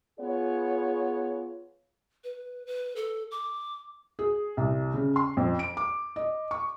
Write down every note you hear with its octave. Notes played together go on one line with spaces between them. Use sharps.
B3 F4 G#4 C#5
B4
B4
A4
D6
G#4
C2
C#3
C6
F2
D7
D6
D#5
C#6